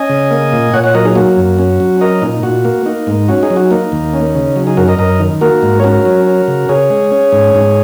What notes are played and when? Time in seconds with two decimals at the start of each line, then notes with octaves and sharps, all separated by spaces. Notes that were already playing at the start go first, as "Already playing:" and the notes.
Already playing: C#4 D#5 G#5
0.10 C#3
0.31 A#3
0.52 A#2
0.73 A#2 C#5 F#5
0.83 C#5 F#5
0.94 F#3 A#4 D#5
1.05 D#4 G#4
1.15 A#3 F#4
1.37 F#2
1.59 C#4
1.80 F#3
2.01 C#4 A#4 D#5
2.22 A#2 D#4
2.43 A#2 F#4
2.65 A#3
2.86 A#3 D#4
3.07 G#2
3.28 C#4 F#4
3.43 D#4 G#4
3.50 F#3
3.56 F#4
3.71 A#3 D#4
3.92 D#2
4.13 C#4
4.35 C#3
4.56 F#3
4.67 D#4 G#4
4.77 F#2 F#4 A#4
4.88 A#4 D#5
4.99 F#2 A#4 D#5
5.20 D#3
5.41 A#3 F#4 A#4
5.63 G#2
5.80 C#5
5.84 C#4 F#4 A#4
6.05 F#3
6.27 C#4
6.48 C#3
6.69 C#3 G#4 C#5
6.90 G#3
7.12 C#4
7.32 G#2
7.54 G#2